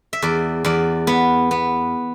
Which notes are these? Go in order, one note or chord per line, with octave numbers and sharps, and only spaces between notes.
E5
E2 D5
E2 D5
B3
B3